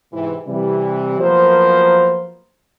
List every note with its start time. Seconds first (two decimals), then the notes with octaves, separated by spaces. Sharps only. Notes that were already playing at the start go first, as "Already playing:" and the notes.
0.13 G#2 C3 E3
0.47 C3 E3 G3
1.20 F3 F#3 A#3 B3 A#4 C5